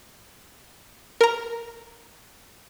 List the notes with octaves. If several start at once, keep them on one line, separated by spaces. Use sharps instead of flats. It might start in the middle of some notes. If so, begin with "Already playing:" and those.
A#4 A#5